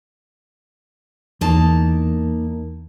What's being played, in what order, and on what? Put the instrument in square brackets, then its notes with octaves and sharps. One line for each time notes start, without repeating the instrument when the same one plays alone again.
[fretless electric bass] E2 [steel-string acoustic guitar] A#3 D#4 A5